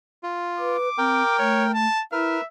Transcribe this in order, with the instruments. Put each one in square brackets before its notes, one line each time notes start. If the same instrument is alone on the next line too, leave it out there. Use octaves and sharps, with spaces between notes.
[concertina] F4
[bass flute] B4 [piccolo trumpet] D6
[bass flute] C4 [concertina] A#4 G5
[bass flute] A3 [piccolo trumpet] C#5
[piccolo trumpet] A5
[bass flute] E4 [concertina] A#4 B4 F6 [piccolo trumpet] E5